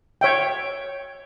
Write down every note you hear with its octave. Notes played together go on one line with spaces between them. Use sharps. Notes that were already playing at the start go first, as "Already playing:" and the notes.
C#5 E5 G5